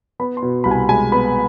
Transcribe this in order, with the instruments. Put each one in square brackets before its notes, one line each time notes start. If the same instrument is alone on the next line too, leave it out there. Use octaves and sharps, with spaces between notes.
[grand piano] B3 B5
C6
B2
C2 B5
G#5
G#3 G#5
B3 B5